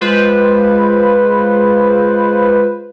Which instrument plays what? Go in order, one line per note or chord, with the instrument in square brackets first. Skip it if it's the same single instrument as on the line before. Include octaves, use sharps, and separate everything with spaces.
[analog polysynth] G#3 F4 B4 C5